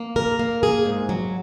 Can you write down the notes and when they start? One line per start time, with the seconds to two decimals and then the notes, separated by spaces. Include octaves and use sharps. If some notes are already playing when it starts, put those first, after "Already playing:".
Already playing: A#3
0.16 A#4
0.39 A#3
0.63 G#4
0.86 G#2
1.09 F#3